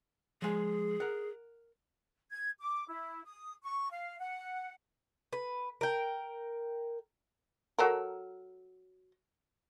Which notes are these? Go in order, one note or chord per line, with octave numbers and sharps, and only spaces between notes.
F3 G#3 G#4
A#4 F#5
G#6
D6
E4
D#6
C#6
F5
F#5
B4
A#4 G5
F#3 A4 A#4